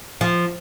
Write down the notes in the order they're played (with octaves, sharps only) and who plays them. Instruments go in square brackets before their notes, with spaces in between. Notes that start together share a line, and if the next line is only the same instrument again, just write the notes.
[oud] F3